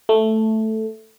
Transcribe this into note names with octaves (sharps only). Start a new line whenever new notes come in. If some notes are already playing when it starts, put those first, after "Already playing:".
A3